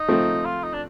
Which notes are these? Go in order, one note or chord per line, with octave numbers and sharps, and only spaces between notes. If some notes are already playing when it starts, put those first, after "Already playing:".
Already playing: D#4
F3 A3 C4
F4
D#4
D4